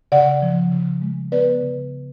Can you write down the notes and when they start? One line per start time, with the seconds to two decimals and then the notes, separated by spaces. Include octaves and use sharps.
0.12 C#3 D5 F#5
0.42 F3
0.72 C#3
1.02 G#3
1.32 B3 B4 D5
1.62 C#3